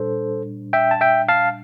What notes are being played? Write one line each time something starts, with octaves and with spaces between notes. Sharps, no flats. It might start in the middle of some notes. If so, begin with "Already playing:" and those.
Already playing: A#2 G3 D4 A4 C5
E5 G5
A5
E5 G5
F5 A5